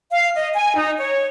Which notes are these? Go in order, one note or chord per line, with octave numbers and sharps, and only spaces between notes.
F5
D#5
G#5
D#4
C#5